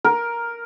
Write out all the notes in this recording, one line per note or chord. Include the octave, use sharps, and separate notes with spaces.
A#4